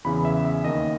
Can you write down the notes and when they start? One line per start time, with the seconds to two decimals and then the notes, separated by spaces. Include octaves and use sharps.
0.04 E2 C#3 E3 B5
0.25 E5
0.45 E5
0.64 D#2 D#3 D#5